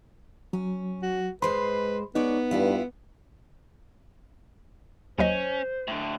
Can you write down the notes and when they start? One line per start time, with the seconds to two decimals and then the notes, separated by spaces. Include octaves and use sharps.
0.53 F#3 C#4
1.03 F#4
1.42 G#2 G#3 B4 C5 B5 C6
2.15 G#3 B3 D#4 C#5 D5
2.51 G2 E4 F4 G4
5.18 D#2 F#3 C#4 C5 D#5
5.88 A2 D3